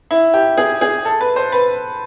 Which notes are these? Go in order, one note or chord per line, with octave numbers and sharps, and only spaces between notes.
E4
G4
G#4
G#4
A4
B4
C5
B4